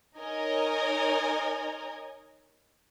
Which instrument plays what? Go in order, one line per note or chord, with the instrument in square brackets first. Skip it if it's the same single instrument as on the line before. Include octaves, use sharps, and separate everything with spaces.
[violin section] D#4 A#4 C#5 D#5 G#5